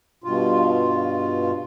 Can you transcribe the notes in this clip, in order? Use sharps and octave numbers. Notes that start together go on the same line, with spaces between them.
G2 B2 F4